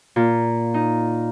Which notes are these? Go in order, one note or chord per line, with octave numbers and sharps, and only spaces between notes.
A#2
D#4